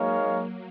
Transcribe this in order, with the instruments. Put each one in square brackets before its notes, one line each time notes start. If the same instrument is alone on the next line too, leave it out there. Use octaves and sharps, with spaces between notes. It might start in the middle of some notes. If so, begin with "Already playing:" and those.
Already playing: [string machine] F#3 A#3 [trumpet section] G#3 D#4 A#4 C#5 F5